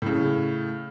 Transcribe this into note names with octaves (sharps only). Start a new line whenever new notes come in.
A2 C#3